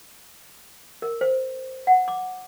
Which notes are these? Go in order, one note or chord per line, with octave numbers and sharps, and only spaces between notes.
A#4
C5
F#5
D6